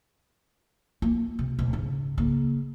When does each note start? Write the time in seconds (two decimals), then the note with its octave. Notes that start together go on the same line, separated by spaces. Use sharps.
1.02 A#3 F4
1.39 C3
1.59 D1 B2
1.73 G#2 C#3
2.18 C#3 A#3